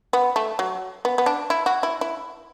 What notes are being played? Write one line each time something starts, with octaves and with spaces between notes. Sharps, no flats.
B3
A3
F#3
B3
B3
D4
E4
F#4
E4
E4